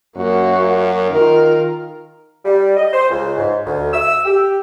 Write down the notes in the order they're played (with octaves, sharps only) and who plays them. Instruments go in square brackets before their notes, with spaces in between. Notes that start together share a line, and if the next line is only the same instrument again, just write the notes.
[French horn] F#2 [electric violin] A#3 F#4
[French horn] D#3 [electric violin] F4 A#4
[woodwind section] G3
D#5
C5
C#2
G#2
D2
E6
G4